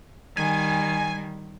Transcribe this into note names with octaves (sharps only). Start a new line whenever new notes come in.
D#3 G3 G#5